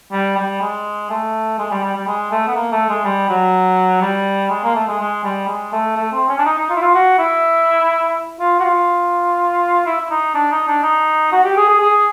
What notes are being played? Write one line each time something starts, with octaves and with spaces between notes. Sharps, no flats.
G3
G3
G#3
A3
G#3
G3
G3
G3
G#3
A3
B3
A#3
A3
G#3
G3
F#3
G3
G#3
A#3
A3
G#3
G#3
G3
G#3
A3
A3
C4
C#4
D4
D#4
D#4
F4
E4
F4
F#4
E4
F4
F#4
F4
E4
E4
D#4
D4
D#4
D4
D#4
F#4
G4
G#4
G#4
G#4